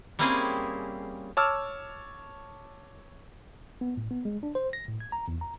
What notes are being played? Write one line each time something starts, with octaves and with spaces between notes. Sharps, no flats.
G3 A#3 C4 C#4 E4 G#4
C#5 A5 D6 E6 F6
B3
A2
B3
G#3
D4
C5
A#6
A2
G#6
A#5
E2
A#5